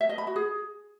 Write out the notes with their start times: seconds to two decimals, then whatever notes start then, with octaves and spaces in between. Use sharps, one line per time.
0.01 E5
0.09 D#5
0.18 B5
0.27 F#4
0.36 G#4